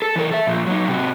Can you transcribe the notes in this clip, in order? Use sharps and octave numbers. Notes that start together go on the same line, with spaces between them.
A4
E3 A#4
A4 E5
A#2 F3
F#3 D#4
C3 F#4